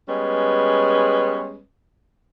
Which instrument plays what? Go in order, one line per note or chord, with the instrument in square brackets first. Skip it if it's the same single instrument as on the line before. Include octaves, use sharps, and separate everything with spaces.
[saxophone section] G3 G#3 B3 C#4 B4